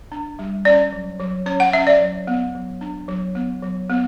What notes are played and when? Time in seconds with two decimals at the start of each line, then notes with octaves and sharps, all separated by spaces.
0.12 D4
0.39 G3
0.65 C#4 D5
0.92 F#3
1.19 F#3
1.46 C#4 C#5
1.60 F#5
1.73 C#4 E5
1.87 D5
2.01 F#3
2.27 B3
2.55 F#3
2.81 D4
3.08 F#3
3.35 B3
3.62 F#3
3.90 B3